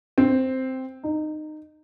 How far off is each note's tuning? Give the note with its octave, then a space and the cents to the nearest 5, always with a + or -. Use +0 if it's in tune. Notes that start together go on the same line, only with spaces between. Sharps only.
C4 -5
D#4 -20